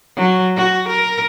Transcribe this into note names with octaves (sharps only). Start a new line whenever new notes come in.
F#3
F#4
A#4